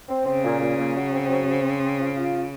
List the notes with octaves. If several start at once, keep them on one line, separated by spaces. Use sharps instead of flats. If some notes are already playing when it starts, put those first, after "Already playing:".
C4
C#3 C4
A#2
A#2
A#2
F#3
C4
F#3
C4
C5
C4
F4
F4